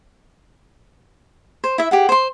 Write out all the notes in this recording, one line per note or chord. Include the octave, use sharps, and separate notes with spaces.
C5
E4 E5
G4 G#4 F#5
C5 C6